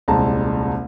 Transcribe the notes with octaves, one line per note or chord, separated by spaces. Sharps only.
D#1 C2 G#3 A5 A#5